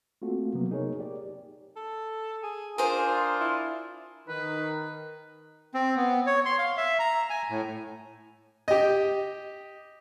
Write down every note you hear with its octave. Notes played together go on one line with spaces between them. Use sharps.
A3 A#3 C4 F4 F#4 A4
C3 F#3 A#3 B3
D#4 G#4 A#4 C#5
G4 D5
A4
G#4
D4 F4 G#4 A#4 C5
E4
D#3 B4
C4
B3
C#5
C6
F5
E5
A#5
G#5
A2
G4 D#5